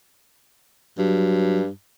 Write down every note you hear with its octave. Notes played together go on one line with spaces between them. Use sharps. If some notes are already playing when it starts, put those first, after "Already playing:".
G2 F#3